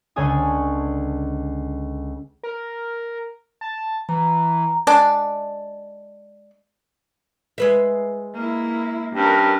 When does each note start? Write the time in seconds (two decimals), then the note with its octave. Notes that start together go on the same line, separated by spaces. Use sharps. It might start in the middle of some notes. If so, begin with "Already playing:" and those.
0.16 C#2 D3 C#4 A4 G#5 D#6
2.43 A#4
3.61 A5
4.09 E3 A#5
4.87 G#3 D4 D5
7.58 G#3 B4 E5
8.34 A#3 E4
9.15 G2 C#4 A#4